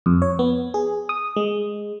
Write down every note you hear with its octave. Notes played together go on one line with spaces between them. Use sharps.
F2
C#5
B3
G#4
D#6
G#3